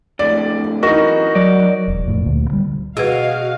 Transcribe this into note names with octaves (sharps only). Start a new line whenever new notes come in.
F2 A2 D3 D5
F#2 E3 D#4 F#4 A#4 D#5
F#3 D5
E1
F2 A2
D2 A#2
D3 G3
B2 F#4 G#4 B4 D#5 F5